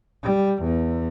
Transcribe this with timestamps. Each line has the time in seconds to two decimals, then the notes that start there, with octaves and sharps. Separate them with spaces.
0.23 G3
0.62 E2